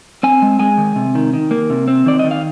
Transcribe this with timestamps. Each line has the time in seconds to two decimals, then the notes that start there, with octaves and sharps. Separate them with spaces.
0.23 C4 G#5
0.42 G#3
0.59 G#3 G#5
0.78 D#3
0.96 C3
1.15 D#3
1.33 D#3
1.51 A#3
1.70 C3
1.88 C4
2.06 D#3 D5
2.19 D#3 D#5
2.31 F5